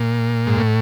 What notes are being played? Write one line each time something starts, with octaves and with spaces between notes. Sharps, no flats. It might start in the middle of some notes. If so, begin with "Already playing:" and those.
Already playing: A#2
G#2
A2